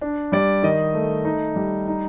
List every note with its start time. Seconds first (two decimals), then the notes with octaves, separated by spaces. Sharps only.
0.01 D4
0.32 G3 D5
0.63 D#3 D#5
0.94 A3
1.25 D#4
1.56 G3
1.88 D#4